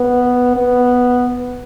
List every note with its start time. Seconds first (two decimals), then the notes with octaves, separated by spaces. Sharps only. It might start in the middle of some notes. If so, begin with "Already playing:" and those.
Already playing: B3
0.56 B3